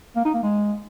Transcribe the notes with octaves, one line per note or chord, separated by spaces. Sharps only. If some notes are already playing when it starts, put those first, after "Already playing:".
A#3
D#4
A#3
G#3